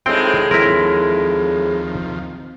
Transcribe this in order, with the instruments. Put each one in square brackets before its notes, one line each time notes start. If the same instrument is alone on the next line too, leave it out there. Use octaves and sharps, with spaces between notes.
[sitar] A2 G#3 [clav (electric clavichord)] C4 G5 [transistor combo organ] D#4 F4 G4
[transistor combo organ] D#2 F3 [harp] C4 [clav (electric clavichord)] E4 A#4